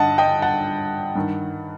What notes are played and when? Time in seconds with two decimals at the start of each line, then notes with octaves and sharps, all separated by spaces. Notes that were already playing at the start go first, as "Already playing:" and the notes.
Already playing: G2 D3 D#5 F#5 A5
0.18 D#5 G5
0.42 F#5 A5
1.15 G2 D#3